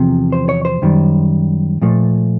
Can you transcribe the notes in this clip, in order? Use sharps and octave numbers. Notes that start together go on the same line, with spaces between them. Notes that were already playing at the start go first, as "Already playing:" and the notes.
Already playing: E2 C3 F3
C5
C#5
C5
F#2 D#3 G3
A#2 F3 A3